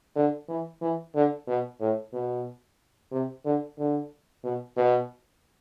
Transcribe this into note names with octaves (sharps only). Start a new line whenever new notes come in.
D3
E3
E3
D3
B2
A2
B2
C3
D3
D3
B2
B2